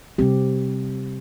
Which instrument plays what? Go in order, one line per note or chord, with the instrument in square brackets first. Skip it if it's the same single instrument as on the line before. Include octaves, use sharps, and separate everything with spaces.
[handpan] C3 G3 C4 G4